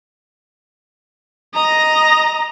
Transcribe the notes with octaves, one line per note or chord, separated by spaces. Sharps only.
D#5 A#5